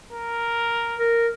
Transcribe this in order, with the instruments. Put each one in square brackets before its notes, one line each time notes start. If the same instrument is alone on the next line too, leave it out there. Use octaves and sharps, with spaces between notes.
[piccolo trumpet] A#4
[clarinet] A#4